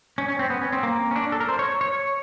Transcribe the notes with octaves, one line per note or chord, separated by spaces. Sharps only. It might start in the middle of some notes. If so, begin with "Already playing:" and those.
C#4
C#4
C4
B3
C#4
C4
A#3
C#4
D4
A4
A#4
C5
C#5
C#5